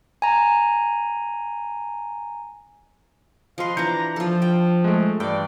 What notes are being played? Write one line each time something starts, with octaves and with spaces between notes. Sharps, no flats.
G#5 A#5
F3 B4 D#5 F5 C6
E3 D4 A#5 G6 C#7
F3 F4 A4
G5
G#3 A3
G2 E3 D5 G5